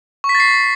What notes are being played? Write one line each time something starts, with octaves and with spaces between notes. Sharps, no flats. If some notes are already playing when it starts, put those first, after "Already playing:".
C#6
B6
A6
C7